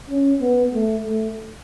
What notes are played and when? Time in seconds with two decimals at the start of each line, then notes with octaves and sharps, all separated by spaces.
0.10 C#4
0.41 B3
0.74 A3
1.06 A3